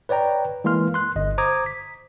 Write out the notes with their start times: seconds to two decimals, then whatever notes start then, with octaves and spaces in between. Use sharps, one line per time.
0.09 B4 C#5 D5 G5 A#5
0.64 E3 G#3 A#3 C6 F6
0.94 C6 F#6
1.16 G1 D#5
1.38 C5 A#5 D6 D#6 G#6
1.66 B6